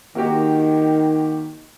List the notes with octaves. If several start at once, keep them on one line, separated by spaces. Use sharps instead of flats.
D#3 A#3 F#4 G4